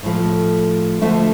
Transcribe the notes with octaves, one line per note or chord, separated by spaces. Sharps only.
A2 F3 A3
D2 D3 F3 A3 E5